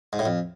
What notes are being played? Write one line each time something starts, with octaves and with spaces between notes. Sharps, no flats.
G#2
A2
F2